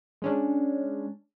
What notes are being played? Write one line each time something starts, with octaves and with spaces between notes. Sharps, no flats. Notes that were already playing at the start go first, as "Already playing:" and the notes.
G#3 C#4 D4